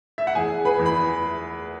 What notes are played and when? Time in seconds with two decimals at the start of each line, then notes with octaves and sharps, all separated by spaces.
0.18 E5
0.27 F#5
0.35 E2 G#4 G#5
0.65 B4 B5
0.79 E2
0.86 B5